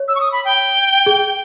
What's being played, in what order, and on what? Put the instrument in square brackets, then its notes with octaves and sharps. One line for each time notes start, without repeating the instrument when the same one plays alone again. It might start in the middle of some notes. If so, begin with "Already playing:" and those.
Already playing: [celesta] C#5
[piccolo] E6
C#6
D#6
B5
G5
[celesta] G#4